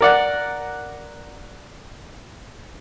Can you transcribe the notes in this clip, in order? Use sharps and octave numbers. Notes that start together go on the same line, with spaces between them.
A#4 D5 F#5